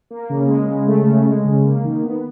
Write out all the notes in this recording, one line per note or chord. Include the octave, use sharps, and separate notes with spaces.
A#3
C#3
G#3
C#3
A3
C#3
G#3
C#3
A#3
D#3
B3